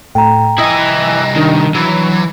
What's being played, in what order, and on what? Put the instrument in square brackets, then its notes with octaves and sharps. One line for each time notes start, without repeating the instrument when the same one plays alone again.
[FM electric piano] A2 A4 [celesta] G5 A#5
[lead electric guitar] C2 D#5 [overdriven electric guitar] E4 G#5 [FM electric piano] D#6
[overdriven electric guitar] D#3 [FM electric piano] D4 D#4
[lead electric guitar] E3 [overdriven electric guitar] F#3